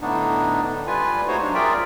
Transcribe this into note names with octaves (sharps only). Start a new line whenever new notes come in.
A2 D3 A3 B3 D4 D#4
G3 F4 B4 G#5
A3 D#4 F#4 C5 C#5
F#3 D4
F4 G#4 A#4 D5 E5 G5